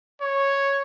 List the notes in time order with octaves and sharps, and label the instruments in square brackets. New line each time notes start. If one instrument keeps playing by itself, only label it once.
[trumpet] C#5